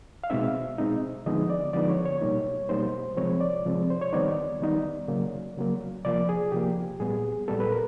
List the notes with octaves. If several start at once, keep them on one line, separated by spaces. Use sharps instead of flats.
F5
B2 G#3 C4 D#4 E5
B2 G#3 C4 D#4
D3 F3 G#3 B3 D#4 D#5
D5
D3 F3 G#3 B3 D#4 D5
C#5
C#5
B2 G3 A#3 D#4
B2 G3 A#3 D#4 C5
C3 F3 G#3 C4 C#5
D5
C3 F3 G#3 C4
C5
C#5
D#3 G3 B3 D#4 D5
D#3 G3 B3 D#4
C#3 F#3 A#3
C#3 F#3 A#3
C3 F3 A#3 D5
G#4
C3 F3 A#3 G4
A#2 G3 B3 G#4
A#2 G3 B3 A4
B4
A#4